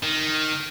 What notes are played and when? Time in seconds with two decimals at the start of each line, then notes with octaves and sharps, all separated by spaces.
0.03 D#3